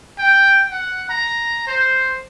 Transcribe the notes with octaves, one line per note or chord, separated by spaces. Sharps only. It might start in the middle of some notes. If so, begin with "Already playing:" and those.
G5
F#5
A#5
C5